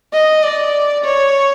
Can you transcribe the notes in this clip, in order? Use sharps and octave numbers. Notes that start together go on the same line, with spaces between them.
D#5
D5
C#5